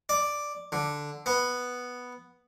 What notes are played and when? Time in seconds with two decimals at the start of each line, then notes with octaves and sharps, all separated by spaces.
0.09 D5
0.72 D3
1.26 B3